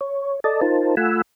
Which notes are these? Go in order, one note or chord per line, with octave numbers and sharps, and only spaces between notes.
C#5
A4 D5 D#5 A5
D#4 F4 A#4 C5 A5
A3 F4 F#5 G#5 B5 E6